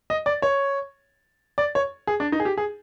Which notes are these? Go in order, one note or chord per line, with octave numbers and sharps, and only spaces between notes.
D#5
D5
C#5
D5
C#5
G#4
D4
D#4
G#4
G4
G#4